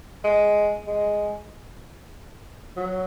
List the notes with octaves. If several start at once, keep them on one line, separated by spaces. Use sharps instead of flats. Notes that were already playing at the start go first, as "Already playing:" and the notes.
G#3
G#3
F#3